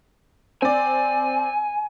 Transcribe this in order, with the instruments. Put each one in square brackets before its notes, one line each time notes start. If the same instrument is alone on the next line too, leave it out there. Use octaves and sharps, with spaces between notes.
[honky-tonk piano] C4 D5 [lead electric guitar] G#5